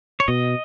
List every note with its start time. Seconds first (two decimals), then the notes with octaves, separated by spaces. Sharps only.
0.20 C#5
0.28 B2 D#5